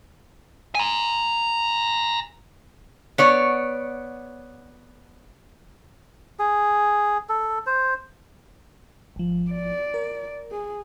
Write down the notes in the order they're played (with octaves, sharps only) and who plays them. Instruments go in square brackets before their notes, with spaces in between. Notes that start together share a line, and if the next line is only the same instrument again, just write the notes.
[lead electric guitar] G#5 A#5
[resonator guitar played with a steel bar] B3 C#5 D5
[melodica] G#4
A4
C5
[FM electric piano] G#1 F3
[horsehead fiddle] D5
[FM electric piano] A#4
[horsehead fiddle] G#4